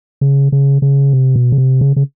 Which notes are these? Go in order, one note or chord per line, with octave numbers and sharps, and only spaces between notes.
C#3
C#3
C#3
C3
B2
C#3
C3
C#3
C#3